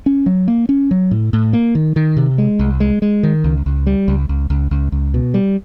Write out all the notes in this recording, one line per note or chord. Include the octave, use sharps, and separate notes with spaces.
C#4
F#3
A#3
C#4
F#3
A2
A2
A#3
D#3
D#3
C3
G#3
C2
G#3
G#3
D#3
C#2
C#2
G3
C#2
C#2
C#2
C#2
C#2
B2
G3